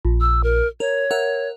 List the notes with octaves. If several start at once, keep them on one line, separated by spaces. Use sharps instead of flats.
A#1
E6
A#4
A#4 C#5
A#4 E5 F#5